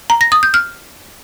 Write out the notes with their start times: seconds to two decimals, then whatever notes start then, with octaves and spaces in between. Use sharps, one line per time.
0.10 A#5
0.21 A#6
0.32 D#6
0.43 G6
0.54 F6